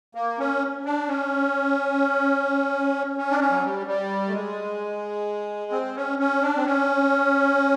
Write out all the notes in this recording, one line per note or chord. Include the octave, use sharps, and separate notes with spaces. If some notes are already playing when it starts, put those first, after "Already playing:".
A#3
C#4
D4
C#4
C#4
D4
C#4
F#3
G3
G3
A3
G#3
C4
C#4
C#4
D4
C4
C#4